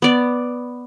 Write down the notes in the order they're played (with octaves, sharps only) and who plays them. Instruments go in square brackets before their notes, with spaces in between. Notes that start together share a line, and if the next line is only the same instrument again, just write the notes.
[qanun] B3 D5